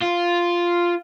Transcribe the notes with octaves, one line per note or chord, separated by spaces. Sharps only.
F4